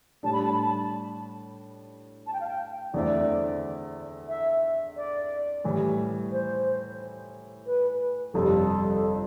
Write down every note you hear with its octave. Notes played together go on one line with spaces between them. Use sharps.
A2 G3 D4 A5
B5
A5
B5
A5
A5
G5
F5
G5
E2 D3 A3 C4 E4 D5
E5
D5
A2 E3 G3
C5
B4
G1 F2 C3 G3 A4